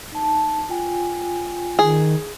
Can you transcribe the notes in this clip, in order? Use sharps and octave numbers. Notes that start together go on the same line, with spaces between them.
D#4 A5
F4 G5 G#5
D#3 G#4